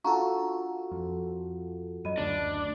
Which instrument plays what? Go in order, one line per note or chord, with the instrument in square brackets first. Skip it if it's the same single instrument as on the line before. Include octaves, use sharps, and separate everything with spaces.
[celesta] D4 A#5 C#6 [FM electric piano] F4 F#4 A4
[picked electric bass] F2
[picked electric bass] F#2 [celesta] D#5 B5 D#7
[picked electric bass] F#1 D2 [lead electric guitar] D4